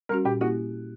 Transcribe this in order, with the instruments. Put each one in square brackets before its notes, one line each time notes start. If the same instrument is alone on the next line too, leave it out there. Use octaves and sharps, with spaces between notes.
[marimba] G3 C#4 F#4 [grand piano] A#4
[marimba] A#2 [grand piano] G4
[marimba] A#3 E4 G4 [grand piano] F#4